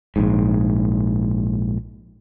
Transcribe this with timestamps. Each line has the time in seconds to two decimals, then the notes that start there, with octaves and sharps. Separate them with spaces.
0.16 A#1 G#2